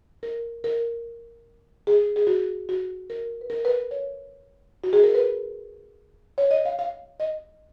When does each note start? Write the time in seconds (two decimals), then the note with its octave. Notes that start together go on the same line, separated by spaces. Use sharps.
0.23 A#4
0.64 A#4
1.87 G#4
2.16 G#4
2.27 F#4
2.69 F#4
3.10 A#4
3.41 B4
3.50 A#4
3.65 B4
3.91 C#5
4.84 F#4
4.93 G#4
5.03 A#4
5.15 B4
6.38 C#5
6.51 D#5
6.65 F5
6.79 F5
7.20 D#5